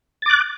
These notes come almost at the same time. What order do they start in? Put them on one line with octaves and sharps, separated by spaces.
A6 D6 F#6